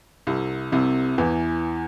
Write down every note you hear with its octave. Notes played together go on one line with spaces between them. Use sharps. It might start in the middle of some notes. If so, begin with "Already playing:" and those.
C2 C3
C2 C3
E2 E3